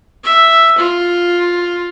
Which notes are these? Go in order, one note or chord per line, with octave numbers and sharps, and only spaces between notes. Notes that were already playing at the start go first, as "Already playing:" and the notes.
E5
F4